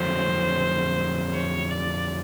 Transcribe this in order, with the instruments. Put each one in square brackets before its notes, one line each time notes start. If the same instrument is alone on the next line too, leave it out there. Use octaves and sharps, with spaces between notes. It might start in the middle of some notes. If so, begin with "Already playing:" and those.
Already playing: [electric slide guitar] F2 D3 F#3 A3 [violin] C5
[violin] C#5
D5